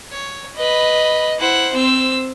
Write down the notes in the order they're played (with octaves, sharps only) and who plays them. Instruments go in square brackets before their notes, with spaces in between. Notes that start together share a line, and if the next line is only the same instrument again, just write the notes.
[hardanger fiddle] C#5
[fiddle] B4 B5 [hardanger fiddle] D#5
[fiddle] E4 F#5 [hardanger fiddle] C5
[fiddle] C4 E6